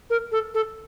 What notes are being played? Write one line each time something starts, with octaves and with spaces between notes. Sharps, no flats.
A#4
A4
A4